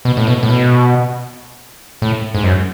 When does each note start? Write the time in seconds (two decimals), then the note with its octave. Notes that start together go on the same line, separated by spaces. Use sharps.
0.05 B2
0.17 A2
0.27 B2
0.43 A2
0.49 B2
2.02 A2
2.35 G#2
2.44 F#2